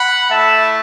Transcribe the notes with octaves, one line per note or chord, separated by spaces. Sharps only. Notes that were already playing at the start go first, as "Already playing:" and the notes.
Already playing: F#5 B5
A3 E4 E5 A5